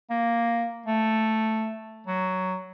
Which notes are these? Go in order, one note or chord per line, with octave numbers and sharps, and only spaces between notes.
A#3
A3
F#3